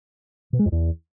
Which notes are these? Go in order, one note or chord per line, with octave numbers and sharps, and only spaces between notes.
B2
G#3
F2
E2